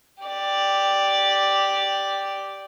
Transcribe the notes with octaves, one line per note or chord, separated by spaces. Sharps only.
G4 D5